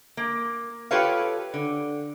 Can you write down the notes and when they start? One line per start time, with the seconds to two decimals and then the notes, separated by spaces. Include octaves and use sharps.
0.17 A#3
0.91 F4 G4 A4 B4 C#5 F5
1.54 D3